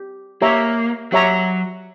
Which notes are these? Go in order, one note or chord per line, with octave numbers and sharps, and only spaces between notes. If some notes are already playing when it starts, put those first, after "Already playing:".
Already playing: G4
A#3 G4 C#5 E5 A#5
F#3 G4 C#5 E5 A#5